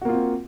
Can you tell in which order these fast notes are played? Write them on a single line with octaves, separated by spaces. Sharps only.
F#4 A#3 F4 C4